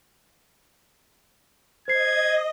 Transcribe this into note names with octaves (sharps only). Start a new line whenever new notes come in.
C5 D#5 G#6 C7